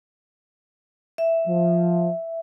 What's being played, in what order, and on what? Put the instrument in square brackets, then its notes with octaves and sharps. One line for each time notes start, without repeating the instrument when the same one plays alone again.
[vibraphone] E5
[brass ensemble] F3